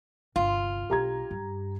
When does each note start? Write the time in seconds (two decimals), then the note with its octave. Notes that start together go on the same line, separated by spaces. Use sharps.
0.36 G1 C3 F4
0.90 B1 D4 G4 A#5 G#6
1.31 G2